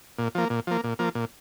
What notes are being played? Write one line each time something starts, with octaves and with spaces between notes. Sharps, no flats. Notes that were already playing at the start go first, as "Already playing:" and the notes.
A#2
F3 A#3
A#2
F3 A#3
A#2
F3 A#3
A#2